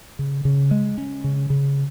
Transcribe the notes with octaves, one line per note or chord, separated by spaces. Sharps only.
C#3
C#3
G#3
C#4
C#3
C#3